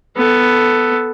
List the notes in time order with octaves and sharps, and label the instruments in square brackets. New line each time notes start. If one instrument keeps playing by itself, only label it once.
[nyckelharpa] B3 A4